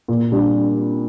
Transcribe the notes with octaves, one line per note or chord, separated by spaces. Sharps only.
A#2
G3 D4